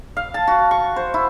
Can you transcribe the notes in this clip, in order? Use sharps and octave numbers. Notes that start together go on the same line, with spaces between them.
F5
A5
F#4
C#6
C5
E4